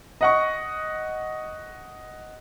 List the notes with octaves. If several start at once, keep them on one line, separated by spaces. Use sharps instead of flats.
D#5 F#5 C#6